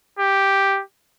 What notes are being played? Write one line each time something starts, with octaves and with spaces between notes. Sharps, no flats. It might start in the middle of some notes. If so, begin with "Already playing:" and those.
G4